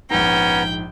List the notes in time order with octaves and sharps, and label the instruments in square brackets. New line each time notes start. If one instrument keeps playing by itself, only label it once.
[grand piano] A#1 G#2 [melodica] B3 A#5 [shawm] C#4 [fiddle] G5